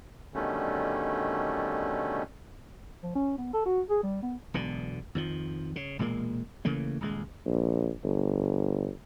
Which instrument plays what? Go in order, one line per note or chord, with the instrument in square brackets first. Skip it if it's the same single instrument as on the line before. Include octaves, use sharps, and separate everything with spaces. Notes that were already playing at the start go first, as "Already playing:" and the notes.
[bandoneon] B2 D3 D#3 G3 A3 C#4
[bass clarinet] F3
C#4
B3
A4
F#4
G#4
G3
B3
[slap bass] E1 B1 B2 D3
F2 D#3 F3
C#3
E1 A#2 G#3 A#3
C#3 E3 A3 A#3
D#1 C#2 G#3
[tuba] A#1
G1